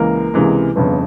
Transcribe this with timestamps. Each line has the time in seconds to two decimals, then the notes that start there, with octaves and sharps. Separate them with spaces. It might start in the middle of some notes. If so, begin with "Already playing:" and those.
Already playing: C#2 E3 A#3 A#4
0.34 C#2 C3 E3 G#3
0.76 G1 F2 C#3 B3 B4